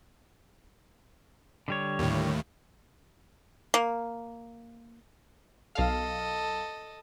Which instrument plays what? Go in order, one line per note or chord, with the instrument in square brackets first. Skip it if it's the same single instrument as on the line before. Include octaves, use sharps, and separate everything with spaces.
[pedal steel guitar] D3 G3 C#5
[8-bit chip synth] D#2 A2
[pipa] A#3
[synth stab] B1 F5 [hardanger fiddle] A4 D#5